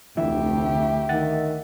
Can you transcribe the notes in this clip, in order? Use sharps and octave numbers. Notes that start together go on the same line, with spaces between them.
F1 D2 D3 E3 E4 G4 E5
D#3 F#5 A6